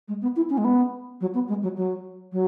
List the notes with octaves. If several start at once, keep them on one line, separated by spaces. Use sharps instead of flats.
G#3
B3
E4
C#4
G#3
B3
F#3
B3
G#3
F#3
F#3
F#3